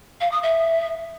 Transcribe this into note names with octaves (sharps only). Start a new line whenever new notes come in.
F5
D#6
E5